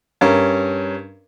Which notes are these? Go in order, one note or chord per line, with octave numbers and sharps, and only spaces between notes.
G2 C#4 A#4